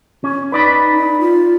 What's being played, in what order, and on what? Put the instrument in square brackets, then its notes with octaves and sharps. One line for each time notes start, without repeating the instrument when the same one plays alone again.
[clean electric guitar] C#4
[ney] D#4 [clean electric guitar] B4 D5 B5
[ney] F4